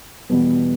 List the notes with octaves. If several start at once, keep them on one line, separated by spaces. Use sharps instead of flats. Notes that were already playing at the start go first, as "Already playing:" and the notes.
E2 B2 G3 B3